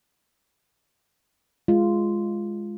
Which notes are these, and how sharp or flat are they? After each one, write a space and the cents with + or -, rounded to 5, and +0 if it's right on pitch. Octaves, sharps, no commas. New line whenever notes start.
G#3 +0 F4 -10